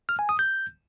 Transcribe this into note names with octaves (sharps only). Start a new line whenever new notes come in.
F6
G#5
D#6
G6